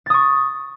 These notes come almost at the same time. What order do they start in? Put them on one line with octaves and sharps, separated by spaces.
A6 D#6 C#6